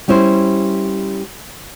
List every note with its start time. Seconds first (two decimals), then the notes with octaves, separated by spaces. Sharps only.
0.08 G3 C#4 E4 C5